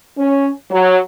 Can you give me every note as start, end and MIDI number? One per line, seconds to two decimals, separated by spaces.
0.18 0.50 61
0.71 0.98 54